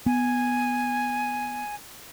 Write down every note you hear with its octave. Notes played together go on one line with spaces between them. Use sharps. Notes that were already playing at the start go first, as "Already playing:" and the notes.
B3 G#5